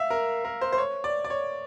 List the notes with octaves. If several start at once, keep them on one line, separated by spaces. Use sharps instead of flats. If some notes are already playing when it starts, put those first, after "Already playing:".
Already playing: E5 F5
A#4
A#4
C5
C5
C#5
D5
D5
C#5